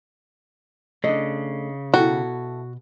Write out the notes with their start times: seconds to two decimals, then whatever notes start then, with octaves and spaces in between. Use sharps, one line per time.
1.04 C#3 A3 D4 D#5
1.94 B2 E4 F#4 A4 G5 A#5